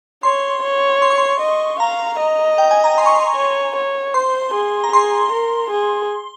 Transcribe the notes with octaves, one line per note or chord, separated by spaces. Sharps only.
C#5 C6
C#5
C6
C#6
C6
D#5
F5 A#5
D#5
G5
G#5
A#5
C6
C#6
C6
C#5
C#5
C5 C6
G#4
A#5
G#4 C6
A#4
G#4